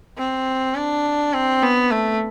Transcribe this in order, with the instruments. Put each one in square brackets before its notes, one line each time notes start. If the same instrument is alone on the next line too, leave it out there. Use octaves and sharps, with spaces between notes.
[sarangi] C4
D4
C4
B3
A3